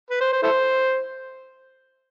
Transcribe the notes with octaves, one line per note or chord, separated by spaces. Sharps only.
B4
C5
C5
E4 A4 C5